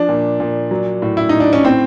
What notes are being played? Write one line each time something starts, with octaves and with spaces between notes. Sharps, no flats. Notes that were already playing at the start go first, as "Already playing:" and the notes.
Already playing: F3 D4
A#2
A#2
F#3
A2
E4
A2 D#4
D4
C#4
A2 C4